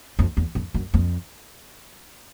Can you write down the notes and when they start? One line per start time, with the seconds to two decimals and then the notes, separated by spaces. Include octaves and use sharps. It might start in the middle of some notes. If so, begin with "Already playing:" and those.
0.19 F2
0.37 E2
0.55 F2
0.74 F#2
0.94 F2